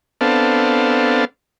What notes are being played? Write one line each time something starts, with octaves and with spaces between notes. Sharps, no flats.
B3 C4 D4 A4 F5